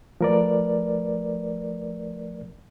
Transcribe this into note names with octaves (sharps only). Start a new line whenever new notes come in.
F3 A3 A#4 B4 D5